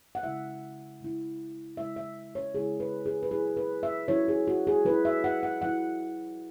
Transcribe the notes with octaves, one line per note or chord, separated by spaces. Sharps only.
F#5
C#3 G#3 E4 E5
C#3 G#3 E4
C#3 G#3 E4 E5
E5
C#5
C#3 G#3 E4 G#4
B4
G#4
B4
F#3 E4 G#4
B4
E5
F#3 E4 C#5
G#4
F#4
G#4
F#3 E4 B4
E5
F#5
F#5
F#3 E4 F#5